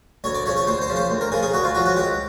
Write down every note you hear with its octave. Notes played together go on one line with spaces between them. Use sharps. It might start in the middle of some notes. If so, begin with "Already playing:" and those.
D2 C#5
D5
C#3 F3 C#5
C#5
D2 C5
C5
C#3 F3
C5
D2
A#4
C#3 F3 G#4
G#4
D2 F#4
F4
C#3 F3 F#4
F#4
C#2 G4